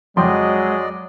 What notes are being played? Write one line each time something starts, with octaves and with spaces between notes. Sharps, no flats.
F2 F#3 G#3 D5 D#5 G5 C6